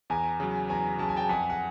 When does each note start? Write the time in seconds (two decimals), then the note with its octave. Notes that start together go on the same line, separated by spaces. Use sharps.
0.10 E2 G#5 A#5
0.40 C#3 F#3
0.69 E2 G#5 A#5
0.99 C#3 F#3 A5
1.09 G#5
1.17 G5 A5
1.29 F2 F#5 G#5
1.50 F#5